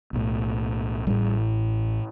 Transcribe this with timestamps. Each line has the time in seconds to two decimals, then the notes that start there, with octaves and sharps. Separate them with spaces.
0.13 B1 A2
1.07 A1 A2 G3